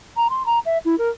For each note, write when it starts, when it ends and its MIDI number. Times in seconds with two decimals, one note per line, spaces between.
0.17 0.28 82
0.30 0.43 84
0.46 0.59 82
0.66 0.78 76
0.85 0.98 64
0.98 1.09 70